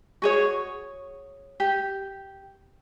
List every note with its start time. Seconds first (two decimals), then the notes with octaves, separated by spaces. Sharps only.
0.22 F#4 G#4 C#5
1.60 G4